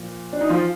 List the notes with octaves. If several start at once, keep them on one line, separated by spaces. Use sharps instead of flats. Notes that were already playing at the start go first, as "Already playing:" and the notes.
Already playing: A#2 F3
D4
D#4
F3 F4